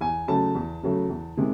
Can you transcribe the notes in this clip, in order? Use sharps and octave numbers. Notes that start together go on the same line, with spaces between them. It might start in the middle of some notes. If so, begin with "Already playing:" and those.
E2 G#5
C#3 F#3 A3 A5
E2
C#3 F#3 A3
E2
C3 D#3 G#3